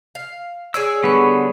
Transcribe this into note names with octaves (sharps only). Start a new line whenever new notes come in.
F5
G#4 C#5 D5 E6
D3 G3 B3 B5 C#6